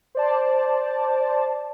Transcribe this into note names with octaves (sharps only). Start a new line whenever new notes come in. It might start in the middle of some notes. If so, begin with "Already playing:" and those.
C5 D5 A5